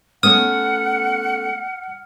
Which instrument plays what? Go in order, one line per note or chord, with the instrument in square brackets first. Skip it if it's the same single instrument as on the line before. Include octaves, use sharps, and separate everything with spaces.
[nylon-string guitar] A3 B3 C#4 [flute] F#5 [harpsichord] D#6 [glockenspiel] F6